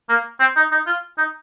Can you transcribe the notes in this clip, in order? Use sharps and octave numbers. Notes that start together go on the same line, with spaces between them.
A#3
C4
D#4
D#4
F4
D#4